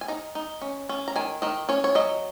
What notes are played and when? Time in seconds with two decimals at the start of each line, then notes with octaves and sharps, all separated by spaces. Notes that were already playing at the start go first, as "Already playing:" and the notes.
0.01 G#5
0.08 D#4 A#5
0.35 D#4
0.61 C#4
0.89 C#4
1.08 A#5
1.16 D#3 G#5
1.42 D#3 D#5
1.69 C#4 C#5
1.84 C#5
1.95 F#3 D#5